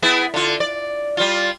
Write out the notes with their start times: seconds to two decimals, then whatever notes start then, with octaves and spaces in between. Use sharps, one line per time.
0.02 B3 E4 G#4
0.34 D3 F4
0.60 D5
1.17 G3 F4